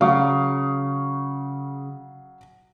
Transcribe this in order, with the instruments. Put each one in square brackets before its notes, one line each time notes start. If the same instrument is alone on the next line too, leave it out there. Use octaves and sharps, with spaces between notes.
[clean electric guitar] C#3 [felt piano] F#3 F5